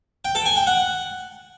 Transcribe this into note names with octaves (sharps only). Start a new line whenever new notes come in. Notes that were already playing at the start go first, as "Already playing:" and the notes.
G5
A4
G#5
G5
F#5